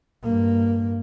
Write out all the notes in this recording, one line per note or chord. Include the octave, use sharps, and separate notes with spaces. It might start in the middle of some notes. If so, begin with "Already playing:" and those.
G2 A#3